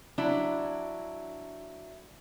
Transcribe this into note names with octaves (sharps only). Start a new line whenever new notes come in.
F#3 D4 E4